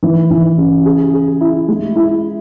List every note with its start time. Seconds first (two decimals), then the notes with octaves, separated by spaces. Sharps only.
0.03 E3
0.30 E3
0.58 C#3
0.85 G#4
1.13 G#4
1.41 E4
1.68 G#3
1.95 E4